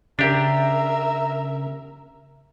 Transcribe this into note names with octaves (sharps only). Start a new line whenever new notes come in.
C#3 D4 G4 A#4 E5